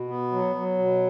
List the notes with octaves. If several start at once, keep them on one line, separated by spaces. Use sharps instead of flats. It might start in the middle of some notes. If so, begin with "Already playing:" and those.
Already playing: B2
B3
F#3
F#3
B2